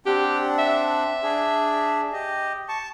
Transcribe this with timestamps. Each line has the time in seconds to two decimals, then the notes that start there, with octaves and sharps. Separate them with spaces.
0.06 C4 D4 G4 F#5
0.59 E5
1.23 D4 G#4
2.13 G4 D#5
2.69 A5 C#6